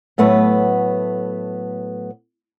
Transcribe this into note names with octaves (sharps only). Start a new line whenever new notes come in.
A2 F#3 A3 B3 B4